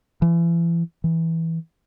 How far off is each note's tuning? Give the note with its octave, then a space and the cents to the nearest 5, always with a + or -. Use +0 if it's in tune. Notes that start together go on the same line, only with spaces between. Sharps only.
E3 +35
E3 -10